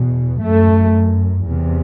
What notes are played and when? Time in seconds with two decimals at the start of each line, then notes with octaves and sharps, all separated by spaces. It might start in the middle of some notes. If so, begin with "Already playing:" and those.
Already playing: E2 B2
0.41 F#2 A3
1.45 E2 C3